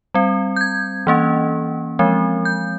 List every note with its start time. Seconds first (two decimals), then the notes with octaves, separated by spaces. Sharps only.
0.14 G3 C4
0.56 G6
0.61 G#6
1.07 E3 A#3 C#4
1.99 F3 G#3 C4
2.45 G6